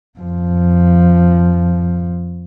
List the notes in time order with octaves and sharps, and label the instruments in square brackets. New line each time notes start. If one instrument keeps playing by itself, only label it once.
[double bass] F2 F3